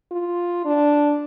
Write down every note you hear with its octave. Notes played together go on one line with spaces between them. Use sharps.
F4
D4